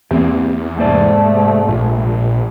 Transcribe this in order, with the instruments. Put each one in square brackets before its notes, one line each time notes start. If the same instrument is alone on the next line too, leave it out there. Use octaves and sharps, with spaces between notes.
[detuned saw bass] E2 [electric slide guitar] A#3 C4 G4
[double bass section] G#2 C3 A3 [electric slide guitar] A#3 C5 D5
[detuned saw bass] A#1 [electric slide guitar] A#2